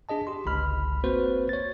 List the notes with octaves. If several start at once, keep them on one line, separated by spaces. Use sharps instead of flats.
D4 G#4 D#5 A5
G4 C6
G1 C#2 B5 F6
A#3 C4 F#4 B4 C5
C#5 A6